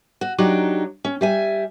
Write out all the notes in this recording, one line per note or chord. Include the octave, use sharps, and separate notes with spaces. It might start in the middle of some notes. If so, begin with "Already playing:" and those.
F#4
F#3 D4 D#4 G4
C#4
G3 E5 G#5